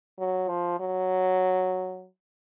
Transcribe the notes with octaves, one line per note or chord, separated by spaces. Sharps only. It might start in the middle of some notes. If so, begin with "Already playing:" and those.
F#3
F3
F#3